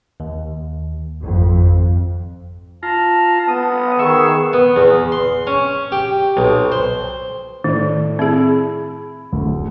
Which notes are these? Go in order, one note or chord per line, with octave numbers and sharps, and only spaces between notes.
D#2
G#1 F2
F4 A5 A#5
B3 D#6
D#3 G#4 E5 C#6 E6
B3
E2
C6
C#4
G4
B1
C5
A2 D#3 D5
C4 E4 G#4
D1 D2